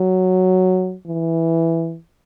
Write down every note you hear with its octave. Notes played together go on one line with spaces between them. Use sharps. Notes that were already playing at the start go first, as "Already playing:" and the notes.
Already playing: F#3
E3